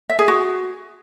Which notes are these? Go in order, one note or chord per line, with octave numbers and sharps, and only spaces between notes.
E5
G#4
F#4